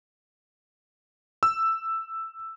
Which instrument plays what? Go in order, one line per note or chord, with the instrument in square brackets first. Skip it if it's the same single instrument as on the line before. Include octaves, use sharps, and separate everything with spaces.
[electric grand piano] E6